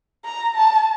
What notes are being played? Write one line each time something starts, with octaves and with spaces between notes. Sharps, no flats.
A#5
A5